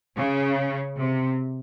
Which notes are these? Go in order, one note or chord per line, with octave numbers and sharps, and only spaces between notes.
C#3
C3